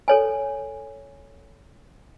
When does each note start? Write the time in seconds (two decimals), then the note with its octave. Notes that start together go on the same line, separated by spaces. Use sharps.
0.08 A4 C#5 G#5